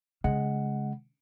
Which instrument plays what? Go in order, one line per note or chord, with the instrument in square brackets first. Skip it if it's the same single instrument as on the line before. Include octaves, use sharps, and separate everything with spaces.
[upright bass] C#3 [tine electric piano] G#3 F#5